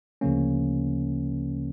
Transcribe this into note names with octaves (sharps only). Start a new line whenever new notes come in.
D2 C#3 F3 A#3 C#4